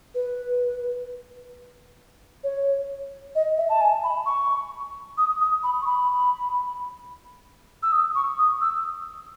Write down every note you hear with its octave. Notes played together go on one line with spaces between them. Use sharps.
B4
C#5
D#5
E5
A5
G#5
B5
C#6
D#6
D#6
B5
C#6
B5
E6
D#6
C#6
D#6
E6